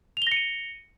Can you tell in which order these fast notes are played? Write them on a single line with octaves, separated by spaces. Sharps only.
F7 G7 A#6 C#7 D#7